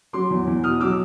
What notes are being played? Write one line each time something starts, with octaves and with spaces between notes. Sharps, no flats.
F#3 C6 D6
E2
E2
B2 D#6 F6
F#3 D6 E6